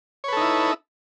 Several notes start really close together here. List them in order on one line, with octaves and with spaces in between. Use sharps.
C#5 B4 A4 D#4 E4